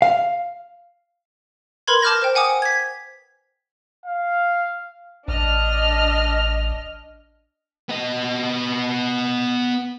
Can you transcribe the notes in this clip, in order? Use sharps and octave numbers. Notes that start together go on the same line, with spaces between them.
F5
A#4 B4 B5 C6 G#6
A5 D6 F6 G6 A#6
C5 G5
F#5 G#5 D6 D#6
G#6 B6
F5
A1 D4 D#5 F6
B3 D#5